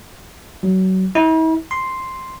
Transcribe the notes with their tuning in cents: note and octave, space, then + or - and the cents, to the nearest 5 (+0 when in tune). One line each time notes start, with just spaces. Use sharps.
F#3 +25
E4 -45
C6 +0